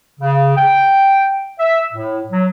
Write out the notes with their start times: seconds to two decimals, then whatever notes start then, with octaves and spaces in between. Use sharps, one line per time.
0.20 C#3
0.56 G5
1.59 E5
1.93 A2
2.31 F#3